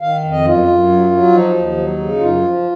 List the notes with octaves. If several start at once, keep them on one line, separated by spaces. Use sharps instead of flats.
D#3 F5
F2
D#5
F#2 F4
F#2
F#3
F#3
F3 D#4
D#2
F#3
C#3
F#2 F4
F3